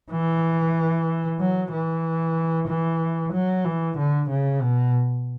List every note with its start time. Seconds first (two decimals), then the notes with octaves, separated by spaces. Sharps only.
0.12 E3
1.40 F#3
1.73 E3
2.68 E3
3.33 F#3
3.65 E3
3.98 D3
4.30 C#3
4.62 B2